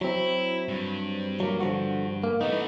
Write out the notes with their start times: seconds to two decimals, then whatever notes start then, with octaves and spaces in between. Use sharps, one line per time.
0.01 F#3 C4 E4
0.68 G2
1.40 F#3 A#3
1.60 D3 F3 F#4
2.24 A#3
2.41 E3 A3 B3 D#4